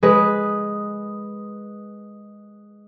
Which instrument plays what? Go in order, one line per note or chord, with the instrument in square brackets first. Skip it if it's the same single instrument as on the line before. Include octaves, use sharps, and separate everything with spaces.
[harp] G#3 B4